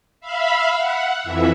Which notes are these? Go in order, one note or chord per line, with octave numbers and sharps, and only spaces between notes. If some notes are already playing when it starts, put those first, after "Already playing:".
E5 F5 B5
F#5
F2 E3 E5